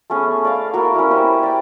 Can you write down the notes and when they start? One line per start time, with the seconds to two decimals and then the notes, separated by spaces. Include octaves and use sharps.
0.10 A3 B3 C#4 G#4
0.45 D5 F5
0.74 A#3 E4 F#4 A#4
0.95 C#4 E4
1.11 G4 B4 C5 A#5
1.43 D5 G5